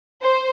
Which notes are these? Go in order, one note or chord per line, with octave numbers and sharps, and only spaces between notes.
C5